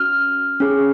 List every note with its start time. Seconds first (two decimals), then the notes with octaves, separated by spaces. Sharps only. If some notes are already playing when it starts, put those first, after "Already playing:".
Already playing: C#4 F#4 F6
0.60 C#4 G#4